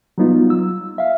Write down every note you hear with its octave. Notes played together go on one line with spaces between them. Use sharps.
F#3 G3 B3 D#4 F4
E6
E5 F5